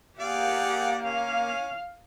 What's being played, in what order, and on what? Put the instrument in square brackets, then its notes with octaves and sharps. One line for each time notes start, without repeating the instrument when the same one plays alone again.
[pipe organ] A#3 [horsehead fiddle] G4 F#5 [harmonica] G#4 D5 F5
[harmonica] C#4 [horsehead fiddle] F5